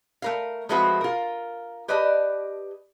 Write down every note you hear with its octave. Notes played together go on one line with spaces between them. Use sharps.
A3 A#4 F5
F3 G#3 A3 C4 F#4 B4
F4 A#4
G4 B4 D5 D#5 A5